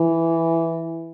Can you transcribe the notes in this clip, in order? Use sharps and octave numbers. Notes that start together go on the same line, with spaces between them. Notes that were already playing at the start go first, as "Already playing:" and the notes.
Already playing: E3